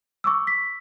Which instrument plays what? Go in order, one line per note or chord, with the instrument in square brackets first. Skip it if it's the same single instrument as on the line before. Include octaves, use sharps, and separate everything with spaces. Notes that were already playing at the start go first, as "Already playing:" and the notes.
[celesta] C#6 D6 E6
B6